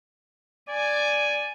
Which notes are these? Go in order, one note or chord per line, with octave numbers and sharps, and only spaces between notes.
D5 G#5